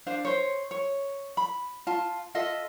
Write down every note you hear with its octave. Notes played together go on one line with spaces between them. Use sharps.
D4 C5 F5
C5 C#5
C#5
B5
F4 A5
F4 A4 D#5 E5